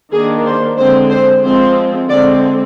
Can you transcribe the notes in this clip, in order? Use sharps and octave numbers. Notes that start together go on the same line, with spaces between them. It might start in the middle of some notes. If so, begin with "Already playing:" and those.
D#3 A#3 D4 G#4
C5
D3 G#3 C4 C5
C5
F3 G#3 C4 C5
D3 G#3 C4 D5